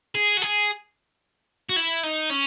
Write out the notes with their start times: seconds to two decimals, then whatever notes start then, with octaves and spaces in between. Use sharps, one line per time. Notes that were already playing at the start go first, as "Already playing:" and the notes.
0.15 G#4
0.37 F#4
0.42 G#4
1.69 F#4
1.76 E4
2.03 D#4
2.30 C#4